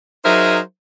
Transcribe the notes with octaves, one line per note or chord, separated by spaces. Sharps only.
F#3 D#4 G#4 A#4 C5 E5